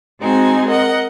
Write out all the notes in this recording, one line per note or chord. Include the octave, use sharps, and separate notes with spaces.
G#3 C4 D#4 F#4 G#5
A#4 D#5 F#5